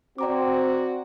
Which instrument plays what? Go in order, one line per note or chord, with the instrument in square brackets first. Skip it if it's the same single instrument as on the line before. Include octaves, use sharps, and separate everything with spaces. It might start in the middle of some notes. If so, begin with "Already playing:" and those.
[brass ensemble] C4 [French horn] F#4 [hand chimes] D5 A#5 D6